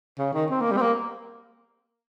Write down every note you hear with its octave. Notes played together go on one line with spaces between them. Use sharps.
C#3
D#3
C4
A#3
G3
C4
A#3